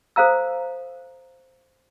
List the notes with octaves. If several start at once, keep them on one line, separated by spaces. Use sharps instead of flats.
A4 C5 F5 A#5 E6